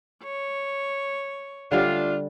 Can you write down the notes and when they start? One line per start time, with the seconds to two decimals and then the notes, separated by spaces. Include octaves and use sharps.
0.23 C#5
1.72 D3 G3 A3 D4 F4